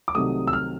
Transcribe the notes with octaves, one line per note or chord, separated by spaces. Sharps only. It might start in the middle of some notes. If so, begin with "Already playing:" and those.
D6
C2 C3 D#3 F#3 A3 D#6
E6
F6